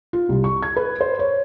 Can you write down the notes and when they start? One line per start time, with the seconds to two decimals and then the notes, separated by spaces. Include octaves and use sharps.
0.13 F4
0.29 C2
0.44 C#6
0.63 G#6
0.76 B4
1.01 C5
1.19 C#5